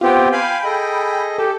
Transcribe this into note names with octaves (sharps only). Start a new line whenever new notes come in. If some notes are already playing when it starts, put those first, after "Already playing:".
B3 C4 F4 G4 G5
F5 G5 G#5 B5
G#4 A4 D#5
G4 A4